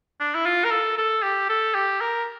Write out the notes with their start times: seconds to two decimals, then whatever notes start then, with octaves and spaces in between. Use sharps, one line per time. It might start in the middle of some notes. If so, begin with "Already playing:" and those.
0.20 D4
0.34 E4
0.46 F4
0.64 A#4
0.71 A4
0.98 A4
1.22 G4
1.49 A4
1.74 G4
2.01 A#4